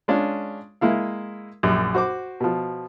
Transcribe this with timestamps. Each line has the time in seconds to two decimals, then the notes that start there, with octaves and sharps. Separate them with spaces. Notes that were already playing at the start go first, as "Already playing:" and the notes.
0.08 G#3 C#4 D4 F4
0.81 G#3 A#3 E4 F5
1.63 A#1 F#2
1.94 F#4 C5 D6
2.40 B2 F3